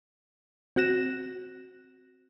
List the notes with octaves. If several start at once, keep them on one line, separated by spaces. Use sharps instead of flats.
C4 F#4 F#6 A#6 E7